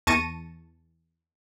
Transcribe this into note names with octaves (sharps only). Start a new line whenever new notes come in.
E2 A5 C#6 A#6 D#7